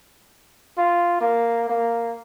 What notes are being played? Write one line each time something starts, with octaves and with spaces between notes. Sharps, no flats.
F4
A#3
A#3